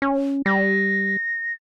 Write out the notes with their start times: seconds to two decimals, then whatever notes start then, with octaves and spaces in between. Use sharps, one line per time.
0.02 C#4
0.46 G3 A#6